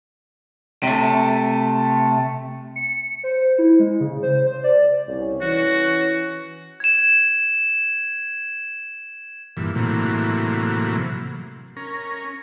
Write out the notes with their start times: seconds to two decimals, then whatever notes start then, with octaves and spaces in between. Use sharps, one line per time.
0.83 C3 A3
2.76 C#7
3.24 C5
3.58 E4
3.79 G#3
4.01 C#3
4.23 C5
4.46 C5
4.64 D5
5.08 C2 C#4 C#5
5.42 E3 F#4
6.80 G#6 E7
9.57 G2 A#2 E3
9.75 A2 C3 E3 F#3 A#3
11.77 C#4 A#4